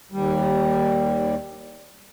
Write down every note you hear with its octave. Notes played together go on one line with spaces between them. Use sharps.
D#2 G3